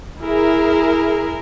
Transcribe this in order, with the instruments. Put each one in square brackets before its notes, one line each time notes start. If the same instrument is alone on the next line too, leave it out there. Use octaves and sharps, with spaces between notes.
[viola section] E4 G#4 A#4